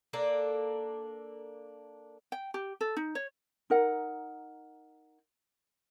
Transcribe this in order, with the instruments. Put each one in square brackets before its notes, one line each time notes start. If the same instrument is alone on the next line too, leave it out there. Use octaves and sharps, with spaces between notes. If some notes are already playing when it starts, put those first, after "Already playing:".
[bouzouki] A#3 D4 A4
[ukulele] G5
G4
A4
D#4
C#5
D#4 A#4 F#5